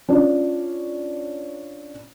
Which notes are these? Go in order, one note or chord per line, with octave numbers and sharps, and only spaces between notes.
C#4 D4 F4